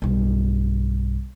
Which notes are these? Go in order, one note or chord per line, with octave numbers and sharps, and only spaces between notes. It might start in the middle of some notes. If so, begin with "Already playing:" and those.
B1 G2